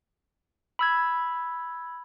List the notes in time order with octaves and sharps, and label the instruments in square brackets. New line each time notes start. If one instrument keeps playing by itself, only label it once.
[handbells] B5 E6 G#6